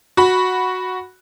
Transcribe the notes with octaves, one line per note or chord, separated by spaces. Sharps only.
F#4 B5